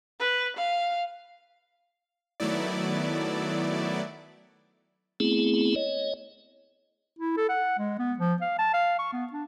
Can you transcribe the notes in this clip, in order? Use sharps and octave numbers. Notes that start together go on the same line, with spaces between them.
B4
F5
D#3 F#3 A3 B3 E4 D5
A3 B3 C4 E4 G#4
C#5 D#5
E4
A4
F#5
G#3
B3
F3
F5
A5
F5
C#6
B3
D4